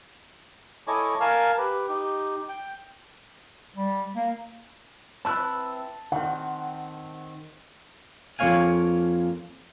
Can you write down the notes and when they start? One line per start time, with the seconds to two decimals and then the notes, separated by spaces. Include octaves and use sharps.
0.88 E4 A4 C#5 D#5 G#5 D6
1.20 A#4 F5 G#5 A5
1.58 G4 B4
1.89 D#4 G4
2.49 G5
3.76 G3
4.15 A#3
5.25 C4 E4 B4 A5
6.12 D#3 C4 F#5
8.39 F2 A#3 C#5 F5 G#5